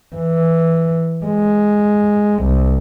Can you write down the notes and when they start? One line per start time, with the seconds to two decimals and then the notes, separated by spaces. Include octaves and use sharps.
0.16 E3
1.26 G#3
2.44 C2